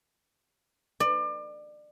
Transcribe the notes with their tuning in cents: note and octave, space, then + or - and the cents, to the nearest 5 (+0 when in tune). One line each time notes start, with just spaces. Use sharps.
D5 +30